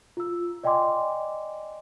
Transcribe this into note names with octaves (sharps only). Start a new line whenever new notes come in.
F4 E6
D5 D#5 G5 G#5 C6 D6